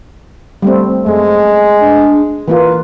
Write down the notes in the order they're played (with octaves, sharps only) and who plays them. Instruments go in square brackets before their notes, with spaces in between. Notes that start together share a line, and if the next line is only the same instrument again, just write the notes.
[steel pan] G3 A3 C4
[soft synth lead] F#2 [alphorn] G#3 [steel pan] A3
[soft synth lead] D4
[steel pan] E3 A#3 F4 [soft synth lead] B4